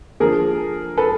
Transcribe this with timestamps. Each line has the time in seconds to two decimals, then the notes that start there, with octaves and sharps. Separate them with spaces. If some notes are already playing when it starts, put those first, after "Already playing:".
0.20 D3 F3 A#3 G#4 A#4
0.97 A4 B4